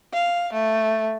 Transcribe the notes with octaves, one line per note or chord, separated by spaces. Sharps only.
F5
A3